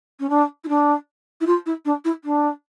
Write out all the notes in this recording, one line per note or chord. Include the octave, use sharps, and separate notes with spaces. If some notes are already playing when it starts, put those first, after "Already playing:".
C#4
D4
E4
D4
E4
F4
E4
D4
E4
D4